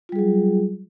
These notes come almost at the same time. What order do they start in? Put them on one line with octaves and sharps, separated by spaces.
F4 G3 G#4 F#3